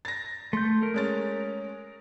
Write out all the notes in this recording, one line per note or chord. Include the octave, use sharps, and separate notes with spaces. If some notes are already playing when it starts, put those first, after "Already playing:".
A6 A#6
A3 C6 G6
A#4
G#3 C#4 A6